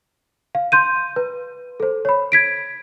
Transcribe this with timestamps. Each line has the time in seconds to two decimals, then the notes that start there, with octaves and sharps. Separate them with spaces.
0.55 F5
0.72 C6 G6 D#7
1.16 B4
1.80 A4 C5
2.05 C#5 B5
2.32 G#6 B6 D7